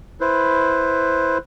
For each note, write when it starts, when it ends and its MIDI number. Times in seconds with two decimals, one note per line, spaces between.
0.21 1.38 64
0.21 1.38 71
0.21 1.38 72